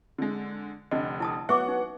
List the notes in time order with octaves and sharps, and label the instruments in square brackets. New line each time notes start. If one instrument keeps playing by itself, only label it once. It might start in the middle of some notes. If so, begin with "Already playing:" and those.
[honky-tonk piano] D3 G#3
[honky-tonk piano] F1 D3 [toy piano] D#5
[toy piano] E4 A5 D#6
[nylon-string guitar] F#3 B3 [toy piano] E5 C#6 D6 [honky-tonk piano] F#5
[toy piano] D#4